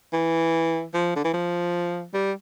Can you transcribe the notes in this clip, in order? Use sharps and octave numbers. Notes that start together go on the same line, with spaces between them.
E3
F3
D3
E3
F3
G3